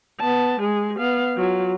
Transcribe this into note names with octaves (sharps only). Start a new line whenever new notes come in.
B3 A5
G#3 G#4
B3 F5
F#3 F4